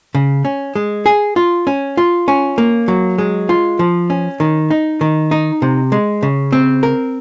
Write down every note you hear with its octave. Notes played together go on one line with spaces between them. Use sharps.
C#3
C#4
G#3
G#4
F4
C#4
F4
C#4
A#3
F#3
G#3
F4
F3
C#4
D#3
D#4
D#3
D#4
C3
G#3
C#3
C4
A#4